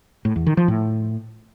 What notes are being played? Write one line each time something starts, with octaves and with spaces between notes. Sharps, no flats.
A2
E2
D#3
F3
A2